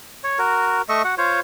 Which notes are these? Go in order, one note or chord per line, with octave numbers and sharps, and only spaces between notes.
C#5
F#4 A#4
A3 D#5 E5 C#6
F#4 F#5
F4 C5 C#5